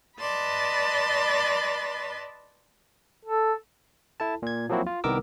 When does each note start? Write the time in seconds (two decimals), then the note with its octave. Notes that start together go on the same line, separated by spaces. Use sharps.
0.20 B4 D5 D#5 A5 B5 C6
3.25 A4
4.20 E4 A4 A5
4.42 A#2 G#6
4.69 F3 F#3 A#3 C4 E4 F#4
4.87 F4
5.04 C2 D#3 B3 A#4 D6 E6